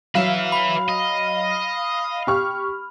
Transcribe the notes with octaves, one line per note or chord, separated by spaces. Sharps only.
F#3 B4 E5 F5
B5
D#5
G4 C#6 F6